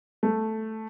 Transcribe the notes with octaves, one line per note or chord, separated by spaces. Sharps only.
A3